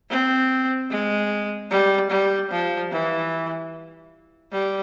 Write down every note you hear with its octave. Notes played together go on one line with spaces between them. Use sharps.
C4
G#3
G3
G3
F3
E3
G3